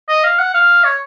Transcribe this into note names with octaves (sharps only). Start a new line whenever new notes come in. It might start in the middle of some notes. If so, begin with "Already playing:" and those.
D#5
F5
F#5
F5
C#5